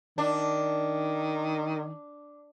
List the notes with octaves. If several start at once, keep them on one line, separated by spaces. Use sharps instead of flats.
D#3 D4